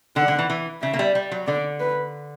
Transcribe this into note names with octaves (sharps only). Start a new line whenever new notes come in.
D3 F#5
D3
E3
E3
C#3 E5
A#3
G3
G3
F#3
D3 D5
B4